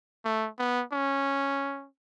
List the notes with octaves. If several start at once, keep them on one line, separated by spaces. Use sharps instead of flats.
A3
B3
C#4